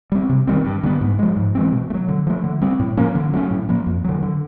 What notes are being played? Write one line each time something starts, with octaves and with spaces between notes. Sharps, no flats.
G3 C4
C3
D#3 G3 C4
G2
D3 G3 B3
G#2
F3 G#3
G#2
E3 G#3 C4
B2
A3
F#3
D3
F3 A3
D3
G3 C4
A2
F3 A#3 C#4
D3
F#3 A3 C#4
A2
F3 A#3
F2
D3 F#3
D3